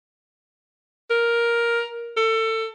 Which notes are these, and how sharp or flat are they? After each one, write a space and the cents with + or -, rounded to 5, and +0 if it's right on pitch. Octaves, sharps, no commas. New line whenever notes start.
A#4 +10
A4 +25